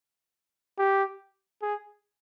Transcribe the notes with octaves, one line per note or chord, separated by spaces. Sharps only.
G4
G#4